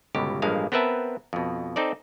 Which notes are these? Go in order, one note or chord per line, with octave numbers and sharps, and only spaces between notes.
G1 C#2 B2 G4
A1 G2 F3 G#3 A#3 F5
B3 C4 A#4 B4 E5 A5
F2 B2
C4 D#4 A4 D5